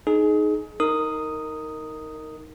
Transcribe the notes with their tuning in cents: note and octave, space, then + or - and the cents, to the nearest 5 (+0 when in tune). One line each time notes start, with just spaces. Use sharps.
D#4 +0 G#4 +25
D#4 +15 A#4 -15 D#6 +0